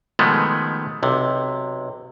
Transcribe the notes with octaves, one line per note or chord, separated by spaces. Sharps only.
B2 D#3 F3 G#3 A3 B3
B1 C3